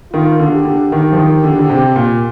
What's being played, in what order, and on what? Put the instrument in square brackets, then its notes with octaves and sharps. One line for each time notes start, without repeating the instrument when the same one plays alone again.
[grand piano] D#3 [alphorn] F4
[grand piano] D3
[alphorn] G4
[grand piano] D3
D#3
F3
D#3
D3
D3
C3
A#2